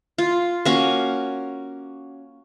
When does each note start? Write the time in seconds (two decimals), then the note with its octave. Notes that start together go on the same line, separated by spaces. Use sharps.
0.18 F4
0.65 A#3 C#4 F#4